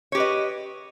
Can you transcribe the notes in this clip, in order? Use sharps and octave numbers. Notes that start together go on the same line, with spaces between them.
G4 B4 C#5 D#5